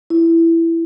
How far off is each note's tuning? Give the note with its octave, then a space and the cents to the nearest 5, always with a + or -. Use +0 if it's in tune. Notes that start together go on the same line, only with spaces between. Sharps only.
E4 +10